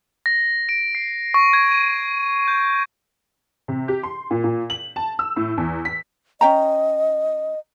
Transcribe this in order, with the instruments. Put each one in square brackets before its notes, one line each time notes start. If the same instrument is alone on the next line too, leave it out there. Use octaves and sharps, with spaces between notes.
[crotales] A#6
D7
C7
C#6
G#6
D#7
G6
[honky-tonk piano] C3
G4
C6
A#2
A#2
F#7
A5
E6
A2
E2
B6
[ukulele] C#4 G5 A#5 [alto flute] D#5